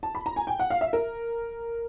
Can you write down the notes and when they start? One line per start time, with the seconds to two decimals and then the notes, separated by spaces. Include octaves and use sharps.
0.03 A5
0.15 B5
0.26 A#5
0.36 G#5
0.47 G5
0.60 F#5
0.70 F5
0.81 E5
0.93 A#4